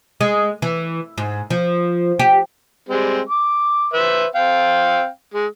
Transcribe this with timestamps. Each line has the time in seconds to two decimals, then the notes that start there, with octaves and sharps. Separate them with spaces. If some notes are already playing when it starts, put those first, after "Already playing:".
0.21 G#3
0.62 E3
1.18 G#2
1.50 F3
2.19 G4
2.89 G3 G#3 C4
3.29 D6
3.93 B4 C5 E5
4.35 C4 F5 G5
5.34 G#3